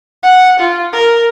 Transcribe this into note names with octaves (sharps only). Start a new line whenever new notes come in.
F#5
F4
A#4